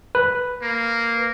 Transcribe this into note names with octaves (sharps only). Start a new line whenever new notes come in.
B4
A#3